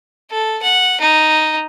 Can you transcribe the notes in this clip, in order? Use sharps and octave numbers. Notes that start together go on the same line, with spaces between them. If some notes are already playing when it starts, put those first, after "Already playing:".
A4
F#5
D#4